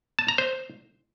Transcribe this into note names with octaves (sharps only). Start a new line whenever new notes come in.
A5
A#5
C5